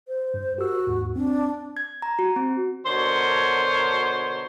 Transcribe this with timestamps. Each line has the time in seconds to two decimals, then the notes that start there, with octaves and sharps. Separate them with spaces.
0.08 C5
0.34 G2
0.58 F#4 G4 A#4 E6
0.87 D#2 G#2
1.16 C4 D4
1.77 G#6
2.02 A#5
2.19 F#4
2.36 C4
2.86 B2 D3 A#4 C5 C#5